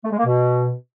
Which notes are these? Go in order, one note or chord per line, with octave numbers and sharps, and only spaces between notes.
A3
G#3
A#3
B2